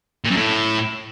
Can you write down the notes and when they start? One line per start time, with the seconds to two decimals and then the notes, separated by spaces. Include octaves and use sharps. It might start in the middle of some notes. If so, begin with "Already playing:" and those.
0.24 A#2
0.30 F#2
0.36 A2